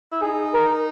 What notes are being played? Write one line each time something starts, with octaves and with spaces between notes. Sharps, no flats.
E4
D#4 G#4
A#4